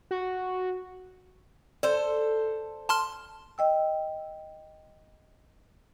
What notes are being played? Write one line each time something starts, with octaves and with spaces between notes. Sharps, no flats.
F#4
A4 C5 D5
A5 C6 F6
D#5 G5 E6